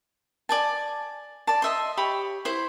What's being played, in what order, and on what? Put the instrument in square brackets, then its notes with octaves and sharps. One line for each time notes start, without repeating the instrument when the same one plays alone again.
[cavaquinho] D5 G#5 A5
D5 A5
D#5 E5 C6
G4 C#5 B5
E4 C5